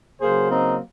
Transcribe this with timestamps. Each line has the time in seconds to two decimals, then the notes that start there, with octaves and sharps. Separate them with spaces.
0.21 C#3 F#3 A#3 G#4 C5
0.51 C4 D#4